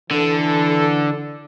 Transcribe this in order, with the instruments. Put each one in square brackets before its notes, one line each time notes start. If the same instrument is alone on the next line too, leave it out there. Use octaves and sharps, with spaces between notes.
[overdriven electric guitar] D3 [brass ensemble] E3 A4